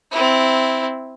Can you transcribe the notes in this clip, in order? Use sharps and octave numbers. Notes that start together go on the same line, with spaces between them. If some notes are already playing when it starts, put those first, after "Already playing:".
C4 E4